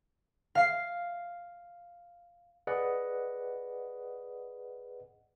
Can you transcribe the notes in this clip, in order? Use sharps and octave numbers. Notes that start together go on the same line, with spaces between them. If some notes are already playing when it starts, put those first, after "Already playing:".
F5 C7
G#4 B4 D5 D#5 F#5